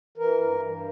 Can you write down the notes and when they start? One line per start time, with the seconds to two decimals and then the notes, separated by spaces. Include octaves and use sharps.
0.18 E3 A#4
0.38 G2
0.60 G2